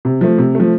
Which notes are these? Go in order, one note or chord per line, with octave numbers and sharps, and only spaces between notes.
C3
F3 A3
C3
F3 A3